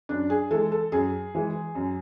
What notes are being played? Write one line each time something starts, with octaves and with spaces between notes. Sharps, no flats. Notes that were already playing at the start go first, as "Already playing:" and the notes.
F#2 D4
G#4
E3 G#3 A4
A4
F#2 G#4
E3 G#3
F#2